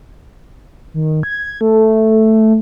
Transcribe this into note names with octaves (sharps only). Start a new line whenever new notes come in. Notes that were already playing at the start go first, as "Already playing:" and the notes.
D#3
G#6
A3